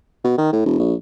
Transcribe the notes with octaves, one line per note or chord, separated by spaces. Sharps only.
B2
D#3
A2
E1
A#1